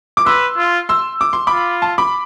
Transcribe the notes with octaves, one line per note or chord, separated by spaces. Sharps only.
D6
B4 C6 E6
F4
C6 E6
D6
C6
F4 B5 D6
A5 C6
B5 D6